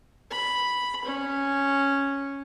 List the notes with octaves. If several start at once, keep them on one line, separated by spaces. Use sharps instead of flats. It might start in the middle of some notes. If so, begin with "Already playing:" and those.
B5
C#4